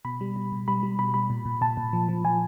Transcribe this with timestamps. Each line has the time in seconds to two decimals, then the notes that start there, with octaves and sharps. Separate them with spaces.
0.05 B2 B5
0.21 G3
0.36 B2
0.52 B2
0.68 G3 B5
0.83 G3
0.99 B2 B5
1.14 G3 B5
1.30 A#2
1.45 A#2
1.61 A#2 A5
1.77 A#2
1.93 F3
2.09 F3
2.25 F3 G#5